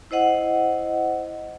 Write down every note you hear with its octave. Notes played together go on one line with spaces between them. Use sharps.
E4 C5 D#5 F#5